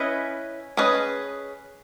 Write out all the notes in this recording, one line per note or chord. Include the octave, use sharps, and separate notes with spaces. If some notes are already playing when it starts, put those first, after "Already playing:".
Already playing: C#4 E4 B4 D#5
C#4 G#4 B4 D#5